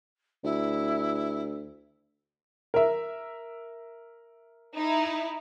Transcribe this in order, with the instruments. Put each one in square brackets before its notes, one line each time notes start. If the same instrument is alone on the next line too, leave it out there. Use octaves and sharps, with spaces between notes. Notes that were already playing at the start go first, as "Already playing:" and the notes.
[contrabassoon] D2 [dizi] E4
[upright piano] A#4 E5
[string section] D#4 E4